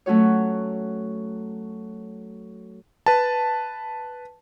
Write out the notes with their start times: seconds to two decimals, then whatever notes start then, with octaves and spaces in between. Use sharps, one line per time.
0.06 F#3 A3 C#4 F#4 C#5
3.06 B4 A5